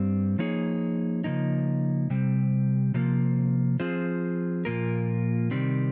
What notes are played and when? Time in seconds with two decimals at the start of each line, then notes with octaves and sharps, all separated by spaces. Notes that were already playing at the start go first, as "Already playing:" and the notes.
Already playing: G2 G3 C4
0.39 F3 A#3 D#4 G#4 C#5
1.24 C#3 F3 A#3 D#4
2.10 C3 G3 C4
2.94 C3 F3 A#3
3.80 F3 C4 F4 G#4 C5
4.65 A#2 F3 A#3 F4 A#4
5.51 C3 D#3 G3 C4